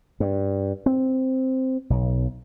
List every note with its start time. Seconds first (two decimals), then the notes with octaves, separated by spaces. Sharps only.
0.20 G2
0.86 C4
1.90 B1